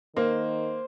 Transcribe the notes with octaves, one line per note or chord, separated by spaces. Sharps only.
D#3 A#3 C5